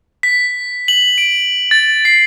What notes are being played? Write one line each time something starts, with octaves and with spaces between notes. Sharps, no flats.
B6
F#7
D7
A6
C7